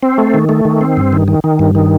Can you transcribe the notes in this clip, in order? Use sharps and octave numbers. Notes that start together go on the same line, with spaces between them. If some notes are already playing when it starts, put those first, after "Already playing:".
C4
A3
D#3
A3
D#3
C4
G2
D#3
D#3
D#3
G2
D#3